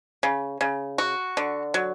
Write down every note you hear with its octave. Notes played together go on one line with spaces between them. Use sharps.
C#3
C#3
F#4
D3
F#3